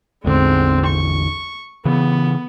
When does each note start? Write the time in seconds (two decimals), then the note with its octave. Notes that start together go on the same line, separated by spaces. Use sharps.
0.25 A1 E2 D3 G#3 C4
0.86 C#6
1.85 C#3 E3 B3